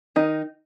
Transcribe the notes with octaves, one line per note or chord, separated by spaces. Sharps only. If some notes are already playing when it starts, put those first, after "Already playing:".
D#3 D#4